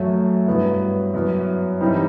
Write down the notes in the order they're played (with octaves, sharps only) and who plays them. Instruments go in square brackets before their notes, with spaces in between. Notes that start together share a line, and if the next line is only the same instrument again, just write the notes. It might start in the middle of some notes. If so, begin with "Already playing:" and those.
Already playing: [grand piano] F#2 F#3 A3
G2 F#3 B3 E4
F#2 F#3 B3 E4
G2 E3 G3 C4 D#4